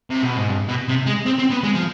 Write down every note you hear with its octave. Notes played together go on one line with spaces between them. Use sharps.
C3
B2
G#2
G2
B2
C3
G#3
C4
C4
B3
G#3
F3